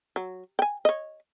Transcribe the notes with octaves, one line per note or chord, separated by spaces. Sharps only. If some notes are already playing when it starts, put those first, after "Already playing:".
F#3
G5 G#5
C#5 D#5